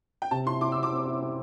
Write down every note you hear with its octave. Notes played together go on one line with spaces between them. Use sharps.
G5
C3 A5
E4 C6
E4 D6
C3 E6
D6
C4
E4
C4